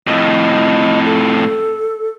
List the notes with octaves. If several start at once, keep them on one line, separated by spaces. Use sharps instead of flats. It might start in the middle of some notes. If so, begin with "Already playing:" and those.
F2 A2 D#5
A4